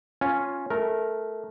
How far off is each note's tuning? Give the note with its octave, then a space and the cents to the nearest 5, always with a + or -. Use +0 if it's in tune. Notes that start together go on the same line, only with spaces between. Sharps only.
C#4 +0 F4 +5 G#5 +0
A3 -15 A#4 +0